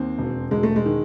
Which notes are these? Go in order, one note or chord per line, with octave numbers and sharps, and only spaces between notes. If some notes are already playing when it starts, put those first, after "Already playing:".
Already playing: D#2 C4
E1
E1 G#3
A3
G#3
D#3